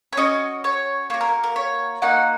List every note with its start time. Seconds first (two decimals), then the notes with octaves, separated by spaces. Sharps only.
0.13 C#5
0.17 C#4 F#4 D#5
0.64 C#5
1.10 A#3 F#4 C#5
1.21 A#4
1.43 A#4
1.56 C#5
2.02 A#3 D#4 F#4 F#5